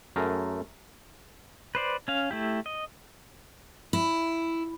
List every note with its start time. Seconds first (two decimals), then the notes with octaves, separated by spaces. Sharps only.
0.16 F#2 A3 G#4 A#4
1.75 B4 C5 D5
2.08 C#4 F5
2.31 A3 E4 G4
2.66 D#5
3.93 E4